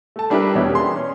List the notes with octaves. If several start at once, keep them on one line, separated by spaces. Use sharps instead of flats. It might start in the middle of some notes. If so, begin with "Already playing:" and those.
A3 A5
G3 D4 E4 G4 A#4 B4
E2 B2 C#4 D4 G4 E5
A#3 G#4 C6
C#4